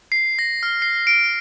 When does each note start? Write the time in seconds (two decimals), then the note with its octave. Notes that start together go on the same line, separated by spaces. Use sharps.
0.12 C7
0.39 A#6
0.63 F6
0.82 C7
1.07 D7